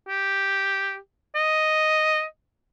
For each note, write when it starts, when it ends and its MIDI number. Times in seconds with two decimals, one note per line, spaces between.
0.09 0.97 67
1.35 2.24 75